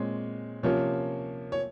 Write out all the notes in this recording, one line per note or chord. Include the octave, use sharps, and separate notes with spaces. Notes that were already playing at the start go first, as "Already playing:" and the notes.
Already playing: A#2 G#3 C4 C#5
C3 F3 A#3 C#4 C#5
C#5